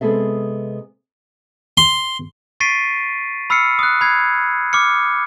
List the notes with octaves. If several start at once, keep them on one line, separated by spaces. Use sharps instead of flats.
C3 G#3 B3 G#4 A4 E5
C6
C#6 A6 B6 C7 D7 D#7
B5 E6 F6 C7 C#7
D#6 F#6
B5 G#6 C7
D6 F6 C#7